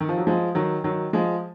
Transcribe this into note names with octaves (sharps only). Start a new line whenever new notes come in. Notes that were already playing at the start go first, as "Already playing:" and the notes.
D#3
F3
F#3
F3 G#3
D#3 F#3
D#3 F#3
F3 G#3